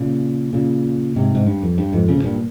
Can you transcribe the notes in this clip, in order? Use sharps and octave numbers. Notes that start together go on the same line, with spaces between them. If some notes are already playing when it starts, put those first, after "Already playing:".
Already playing: A#2 C#3
A#2 C#3
G#2 C3
G#2
G2
F2
G2
F2 G#2
A#2 C#3
G#2
G2 A#2